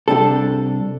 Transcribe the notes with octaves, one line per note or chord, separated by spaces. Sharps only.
C2 G3 D4 A4